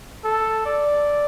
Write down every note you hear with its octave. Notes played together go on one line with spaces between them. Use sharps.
A4
D5